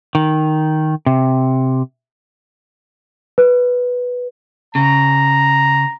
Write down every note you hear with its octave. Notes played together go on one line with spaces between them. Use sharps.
D#3
C3
B4
C#3 A#5